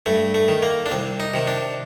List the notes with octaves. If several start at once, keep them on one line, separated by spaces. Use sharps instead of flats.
G2 A3
A3
D#3
A#3
D4
C2 C4
D#4
C3 D#3
D4